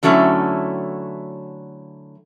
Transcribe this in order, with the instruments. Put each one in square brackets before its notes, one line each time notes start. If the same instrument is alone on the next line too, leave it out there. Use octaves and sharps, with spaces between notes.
[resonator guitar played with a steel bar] D3 F#3 A3 C#4 E4